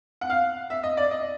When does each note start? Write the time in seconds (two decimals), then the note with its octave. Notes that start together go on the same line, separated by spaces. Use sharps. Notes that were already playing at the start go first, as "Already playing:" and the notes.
0.21 F#5
0.30 F5
0.70 E5
0.83 D#5
0.97 D5
1.11 D#5